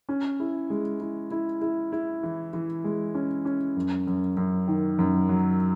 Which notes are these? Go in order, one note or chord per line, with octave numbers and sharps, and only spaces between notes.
C#4
E4
G#3
E4
E4
E4
E4
E3
E3
G#3
C#4
C#4
F#2
F#2
F#2
D#3
F#2
F#3